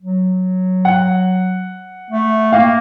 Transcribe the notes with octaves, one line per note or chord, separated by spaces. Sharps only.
F#3
F#5
A3
A#3 F5